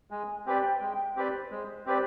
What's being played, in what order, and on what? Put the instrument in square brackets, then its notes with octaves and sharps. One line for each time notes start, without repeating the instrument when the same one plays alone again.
[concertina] G#3 [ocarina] G#5
[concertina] C4 G4 B4 D5 [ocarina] G5
[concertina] G#3
C4 G4 B4 D5
[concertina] G#3 [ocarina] C5
[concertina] C4 G4 B4 D5